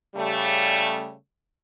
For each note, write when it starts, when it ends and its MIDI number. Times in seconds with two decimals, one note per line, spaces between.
0.15 1.14 49
0.15 1.14 55
0.15 1.14 57